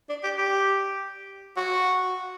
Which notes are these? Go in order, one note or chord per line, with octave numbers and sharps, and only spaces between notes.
D4
G4
G4
F#4